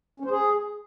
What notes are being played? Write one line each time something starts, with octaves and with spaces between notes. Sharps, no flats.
C#4
C5
G#4